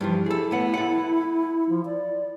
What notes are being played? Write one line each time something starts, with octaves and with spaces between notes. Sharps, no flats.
G2 E3 F3
E4 G#4 A4
A2 B3 F#5
A4 F#5
F3
D5